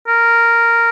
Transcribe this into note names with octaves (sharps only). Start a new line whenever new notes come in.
A#4